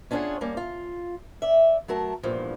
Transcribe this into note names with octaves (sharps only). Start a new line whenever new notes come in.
C#4 D4 F4 G#4 C#5 F#5
G3 A#3 C#4
F4
D5 E5
F#3 A3 A#4 A5
E2 G2 A#2 F3